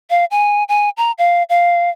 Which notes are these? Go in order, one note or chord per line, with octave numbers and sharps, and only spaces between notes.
F5
G#5
G#5
A#5
F5
F5